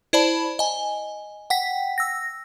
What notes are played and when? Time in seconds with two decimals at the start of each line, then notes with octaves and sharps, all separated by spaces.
0.13 E4 C5 D5 A5 B5
0.59 D#5 G#5
1.50 F#5 G5 B6
1.98 E6 A#6